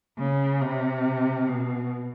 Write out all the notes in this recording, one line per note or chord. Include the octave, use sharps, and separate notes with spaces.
C#3
C3
B2